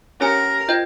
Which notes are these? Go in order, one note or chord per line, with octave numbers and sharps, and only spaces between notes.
C#4 G4 A#4 C#5 G#5
F4 C5 D#5 G5